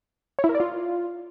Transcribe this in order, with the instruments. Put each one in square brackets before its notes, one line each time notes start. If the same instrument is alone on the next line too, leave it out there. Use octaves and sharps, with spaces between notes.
[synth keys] C#5
E4
A#4
D5
F4